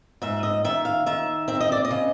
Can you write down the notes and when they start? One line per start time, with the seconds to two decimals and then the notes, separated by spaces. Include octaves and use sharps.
0.22 G#2 E5
0.43 D#5
0.64 D#3 E5
0.85 F5
1.06 D#3 E5
1.48 C4 E5
1.60 D#5
1.72 D5
1.85 D#5
1.91 C#3